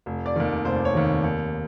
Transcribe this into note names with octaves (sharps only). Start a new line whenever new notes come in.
F1
D5
D#2 D#3
F1 C5
C#5
D#2 D#3
D#2